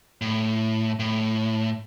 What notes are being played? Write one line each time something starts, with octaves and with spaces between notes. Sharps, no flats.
A2
A2